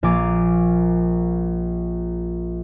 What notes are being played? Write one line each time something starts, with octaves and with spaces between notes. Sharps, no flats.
A#1 A#2 F5 G#5 D6 A6